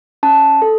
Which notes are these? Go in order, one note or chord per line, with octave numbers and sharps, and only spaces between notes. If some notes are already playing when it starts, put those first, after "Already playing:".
C#4 A5
A4